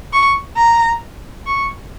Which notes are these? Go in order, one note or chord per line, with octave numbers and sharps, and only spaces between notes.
C#6
A#5
C#6